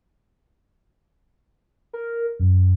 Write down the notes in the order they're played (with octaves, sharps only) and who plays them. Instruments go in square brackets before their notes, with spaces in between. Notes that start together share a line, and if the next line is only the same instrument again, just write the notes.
[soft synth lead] A#4
F#2